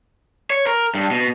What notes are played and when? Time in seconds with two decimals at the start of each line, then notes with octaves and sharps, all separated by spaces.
0.50 C#5
0.67 A#4
0.95 G2
1.11 B2